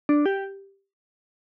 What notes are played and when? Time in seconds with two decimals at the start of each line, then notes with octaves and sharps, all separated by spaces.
0.09 D4
0.26 G4